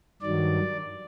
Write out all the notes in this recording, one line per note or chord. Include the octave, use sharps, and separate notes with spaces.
G2 D#3 F#3 D5